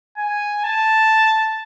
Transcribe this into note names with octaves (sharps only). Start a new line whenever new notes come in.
G#5
A5